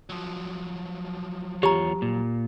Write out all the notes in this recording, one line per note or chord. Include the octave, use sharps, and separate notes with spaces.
F3 F#3
E2 F4 G4 C#5 A#5
A#2